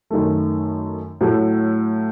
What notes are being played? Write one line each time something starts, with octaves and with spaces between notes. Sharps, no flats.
F#2 D#3 A3
A2 F#3 A3